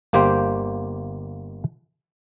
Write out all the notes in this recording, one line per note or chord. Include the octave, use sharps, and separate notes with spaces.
G1 A#3 G4 C5 G5